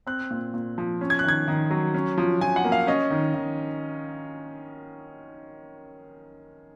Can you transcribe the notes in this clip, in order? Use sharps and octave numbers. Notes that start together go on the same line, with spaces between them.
C4 F#6
A#2
A#2
F3
C#4
G#6
F#6
D#3 G#6
D#3
F#3
C#4
F3
F3 G#5
F#5
A#3
F5
C#4 D#5
D#3
D#3